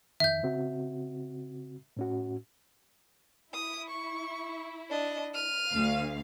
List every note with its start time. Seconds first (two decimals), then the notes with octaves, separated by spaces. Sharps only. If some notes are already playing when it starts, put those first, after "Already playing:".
0.20 F2 D#3 E5 G6
0.43 C#3 C4 F#4
1.97 A2 C#4 F#4
3.54 E4 D#6
3.90 C#6
4.90 D4 D#5
5.34 F6 D#7
5.71 D2 F5